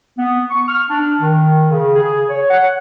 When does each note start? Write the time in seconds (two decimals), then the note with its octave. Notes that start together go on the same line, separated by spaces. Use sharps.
0.18 B3
0.51 C#6
0.69 F6
0.90 D4
1.21 D#3
1.70 C#3
1.96 G#4
2.30 C#5
2.51 F#5